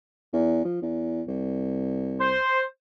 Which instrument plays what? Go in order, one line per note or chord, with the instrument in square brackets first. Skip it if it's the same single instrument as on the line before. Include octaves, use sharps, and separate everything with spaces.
[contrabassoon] E2
F3
E2
C2
[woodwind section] C5